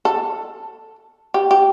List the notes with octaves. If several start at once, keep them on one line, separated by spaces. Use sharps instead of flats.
A4
G4
G4